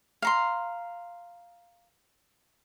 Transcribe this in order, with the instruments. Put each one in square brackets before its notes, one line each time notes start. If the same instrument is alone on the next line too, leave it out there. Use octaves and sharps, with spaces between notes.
[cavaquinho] F5 A#5 C6